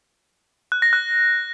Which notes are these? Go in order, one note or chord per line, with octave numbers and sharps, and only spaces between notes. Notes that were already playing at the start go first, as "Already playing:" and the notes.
F#6
A#6
F#6